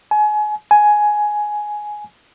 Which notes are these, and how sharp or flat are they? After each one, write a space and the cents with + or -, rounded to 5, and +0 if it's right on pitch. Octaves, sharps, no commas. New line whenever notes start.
G#5 +30
G#5 +10